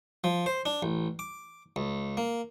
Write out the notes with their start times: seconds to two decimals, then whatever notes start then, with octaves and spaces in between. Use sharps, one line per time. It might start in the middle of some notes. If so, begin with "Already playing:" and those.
0.24 F3
0.46 C5
0.66 D4
0.83 A1
1.19 D6
1.76 C#2
2.17 A#3